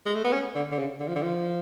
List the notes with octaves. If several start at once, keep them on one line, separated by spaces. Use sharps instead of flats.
G#3
A3
B3
C#4
D3
D3
C#3
D3
F3
D3
F3